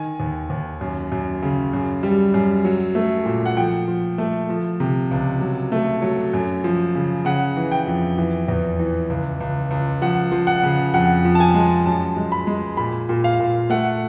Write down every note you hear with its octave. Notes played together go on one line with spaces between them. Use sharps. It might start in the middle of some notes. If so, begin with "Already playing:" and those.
Already playing: D#3 G#5
D#2
D#2
F#2
F#2
C#3
F#2
G3
F#2
F#3
A3
A#2
F#5
F3 G5
F3
A3
F3
C3
C#2
F#3
A3
F#3
F#2
F3
C#3
C#3 F#5
E3
G5
F2
E3
E2
E3
C#2
C#2
C#2
F3 F#5
F3
F#5
C#3
F2 F#5
F3
A5
G#5
G#3
F#2 A5
G#3
B5
G#3
A#2 B5
A#2
F5
A#2
A3 F#5